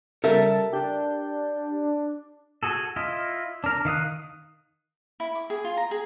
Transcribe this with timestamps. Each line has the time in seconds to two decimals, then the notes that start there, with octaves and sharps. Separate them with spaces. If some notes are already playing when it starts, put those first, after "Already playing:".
0.24 C#3 G3 A4 A#4 E5 A5
0.73 D4 G4 G6
2.63 F#4 G#4 A4
2.96 E4 F4 D#5
3.64 D4 A#4
3.85 D#3 F5 D#6 F#6
5.20 E4
5.35 D6
5.50 G#4
5.65 F4
5.77 A#5
5.91 G#4